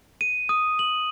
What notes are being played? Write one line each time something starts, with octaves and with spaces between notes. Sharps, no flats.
D#7
D#6
F#7